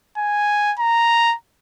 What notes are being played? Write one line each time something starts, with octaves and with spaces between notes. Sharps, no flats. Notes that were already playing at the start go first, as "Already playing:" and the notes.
G#5
A#5